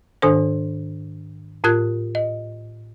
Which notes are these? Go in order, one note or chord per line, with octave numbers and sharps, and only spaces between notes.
G#2 D#3 D4 A4 C5
A2 F4 A#4 F#6 G#6
D#5